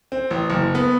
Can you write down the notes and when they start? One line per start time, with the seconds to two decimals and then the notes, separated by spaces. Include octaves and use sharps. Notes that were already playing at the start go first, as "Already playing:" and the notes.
0.12 C4
0.30 A1
0.50 F#1
0.75 B3